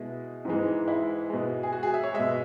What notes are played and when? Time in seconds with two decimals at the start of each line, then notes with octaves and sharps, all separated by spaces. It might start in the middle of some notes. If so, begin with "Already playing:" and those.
Already playing: B2 G#3 E4
0.45 G#2 E3 G#3
0.88 E4
1.30 B2 G#3
1.63 G#4
1.73 F#4
1.83 G#4
1.94 E5
2.04 C#5
2.14 B2 G#3 E5